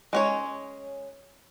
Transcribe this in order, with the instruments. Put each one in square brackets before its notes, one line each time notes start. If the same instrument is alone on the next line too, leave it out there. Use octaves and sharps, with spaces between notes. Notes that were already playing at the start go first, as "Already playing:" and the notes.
[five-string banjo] G#3 C#4 C#5